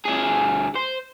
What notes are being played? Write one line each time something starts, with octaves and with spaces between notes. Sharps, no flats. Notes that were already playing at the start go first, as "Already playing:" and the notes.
D2 G#4
C5